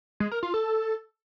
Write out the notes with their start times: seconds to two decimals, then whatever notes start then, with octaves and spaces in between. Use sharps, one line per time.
0.20 G#3
0.31 A#4
0.43 F4
0.54 A4